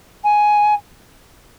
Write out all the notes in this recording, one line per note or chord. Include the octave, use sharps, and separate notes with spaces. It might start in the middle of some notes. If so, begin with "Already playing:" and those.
G#5